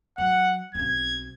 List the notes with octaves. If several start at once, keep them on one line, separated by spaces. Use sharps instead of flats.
F#3 F#5
B1 C4 G#6